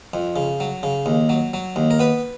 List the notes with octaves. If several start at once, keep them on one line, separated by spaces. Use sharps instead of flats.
F2
C#3
F#3
C#3
D#2
F#3
F#3
D#2
A#4
B3 B4